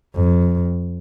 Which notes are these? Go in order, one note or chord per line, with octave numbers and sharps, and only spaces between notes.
F2